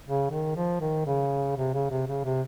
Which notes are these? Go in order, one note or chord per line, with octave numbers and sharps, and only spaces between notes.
C#3
D#3
F3
D#3
C#3
C3
C#3
C3
C#3
C3